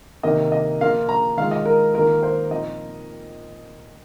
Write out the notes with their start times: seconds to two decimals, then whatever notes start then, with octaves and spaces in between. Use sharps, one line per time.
0.23 C3 D#3 A#3 D#4 D#5
0.52 D#5
0.81 F3 A#3 F4 F5
1.09 A#5
1.37 D#3 G#3 F4 F5
1.51 D#5
1.66 A#4
1.94 D#3 A#3 F4 A#4
2.23 C5
2.51 A#2 F3 C4 D#4 D#5